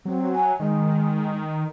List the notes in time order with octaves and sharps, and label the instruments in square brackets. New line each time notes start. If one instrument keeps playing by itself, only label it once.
[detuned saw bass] F#3 [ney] C4
[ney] G#5
[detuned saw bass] D#3 [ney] G#3